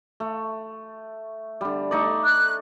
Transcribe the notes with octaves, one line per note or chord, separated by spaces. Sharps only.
A3
D3 G3
A3 D#4 D5
F#6